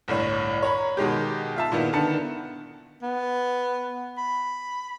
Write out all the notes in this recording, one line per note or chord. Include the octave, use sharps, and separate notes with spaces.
G1 C2 A2 C#5
C#5 A#5 B5
B2 D#3 G#3 G4
F4 E5 A5
A#2 D#3 B3 E4
D3 D#3 B3 A5 C#7
B3
B5